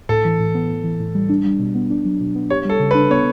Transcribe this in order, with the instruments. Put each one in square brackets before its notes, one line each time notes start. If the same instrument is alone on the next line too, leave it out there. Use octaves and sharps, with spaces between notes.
[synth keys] A2 [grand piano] A4
[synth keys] E3
A2
B3
A2
E3
A2
G3
D4
G3
B2
B3
D4
F#3
B2
B3
[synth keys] G4 [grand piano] C#5
[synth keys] G3 [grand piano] A4
[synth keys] C#3
[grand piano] B4
[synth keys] D4
[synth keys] B3 [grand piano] C#5